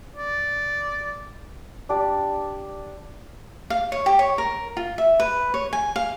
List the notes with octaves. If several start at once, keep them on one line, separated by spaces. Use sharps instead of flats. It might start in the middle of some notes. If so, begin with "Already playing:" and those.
D5
D4 G4 D5
F5
C#5
G4
C#5
A#4
F4
E5
B4
C#5
G#5
F5